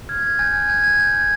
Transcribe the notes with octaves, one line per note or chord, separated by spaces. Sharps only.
F6 G#6
G#6
G#5 G6 A6
G#6
G6 G#6
G#6
G6 A6
G#6